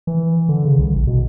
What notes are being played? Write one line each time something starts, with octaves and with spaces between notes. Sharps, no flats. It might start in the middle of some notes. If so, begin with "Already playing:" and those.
E3
D3
C#3
C2
A1
B2